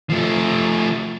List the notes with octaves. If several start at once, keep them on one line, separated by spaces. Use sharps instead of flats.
F3 A3